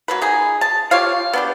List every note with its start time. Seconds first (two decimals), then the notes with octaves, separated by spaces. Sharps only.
0.08 F#3 A#3 B4
0.22 D#4 G#4
0.61 A5
0.91 F4 G4 C#5 F5
1.33 B3 D4 G4